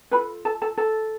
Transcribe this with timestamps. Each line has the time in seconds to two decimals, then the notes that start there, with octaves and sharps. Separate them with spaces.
0.11 F4 A4 B4 B5
0.45 A4 A5
0.62 A4 A5
0.77 A4 A5